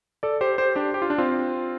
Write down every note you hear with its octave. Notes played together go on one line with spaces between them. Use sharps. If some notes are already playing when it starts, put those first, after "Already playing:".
A4 D5
G4 C5
G4 C5
D4 G4
G4
F4
D4
C4 F4